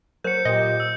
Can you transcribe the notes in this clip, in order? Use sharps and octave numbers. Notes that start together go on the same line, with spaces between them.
F#3 A#4 C5 G6 C#7
A#2 G4 D#5
E6